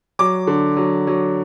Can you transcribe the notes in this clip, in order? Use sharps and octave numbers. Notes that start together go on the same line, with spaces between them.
F#3 D6
D3
F#3
F#3